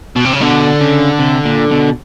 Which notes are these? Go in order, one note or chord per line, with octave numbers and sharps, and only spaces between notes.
B2
C3
C#3
B2 D3
C#3
C3
A#2
B2